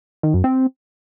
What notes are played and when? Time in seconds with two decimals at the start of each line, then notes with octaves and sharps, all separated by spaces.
0.23 D#3
0.34 F#2
0.44 C4